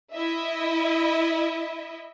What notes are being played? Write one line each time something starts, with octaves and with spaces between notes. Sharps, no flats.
E4 D#5 E5